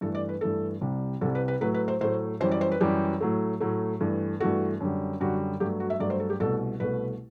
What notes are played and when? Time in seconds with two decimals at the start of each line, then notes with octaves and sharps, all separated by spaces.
0.01 G2 E3 A3 A4
0.15 D5
0.29 B4
0.41 G2 E3 A3 A4
0.81 C2 C3 G3
1.21 C2 C3 G3 A4
1.35 B4
1.48 B4
1.61 A2 F#3 A3 B4
1.74 B4
1.88 C5
2.01 A2 F#3 A3 C5
2.40 F#2 E3 G3 C5
2.51 D5
2.61 C5
2.72 B4
2.80 F#2 E3 G3 G4
3.21 A2 F#3 A3
3.60 A2 F#3 A3
4.01 G2 E3 A3
4.40 G2 E3 A3 F#4
4.80 F#2 D3 G3
5.20 F#2 D3 G3 F#4
5.60 G2 F#3 A3 G4
5.80 F#4
5.90 E5
6.00 G2 F#3 A3 D5
6.10 C5
6.20 A4
6.30 G4
6.40 C2 B2 A3 A4
6.80 C2 B2 A3 B4